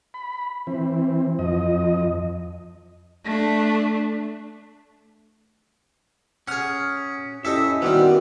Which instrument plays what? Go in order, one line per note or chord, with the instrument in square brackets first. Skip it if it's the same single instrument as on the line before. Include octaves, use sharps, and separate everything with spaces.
[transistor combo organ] B5
E3 C4
F2 D#5
[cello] A3 D4
[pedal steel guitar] C#4 F6 [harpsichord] G#4 F#5
[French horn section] C#4 E4 [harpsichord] G4 A4 D#5 [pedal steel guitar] E5
[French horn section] D#3 F#4 [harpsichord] E3 G3 [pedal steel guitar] B3 C4